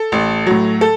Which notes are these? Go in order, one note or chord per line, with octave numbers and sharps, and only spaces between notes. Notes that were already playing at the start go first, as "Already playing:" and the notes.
Already playing: A4
A1
A2 F#3
A4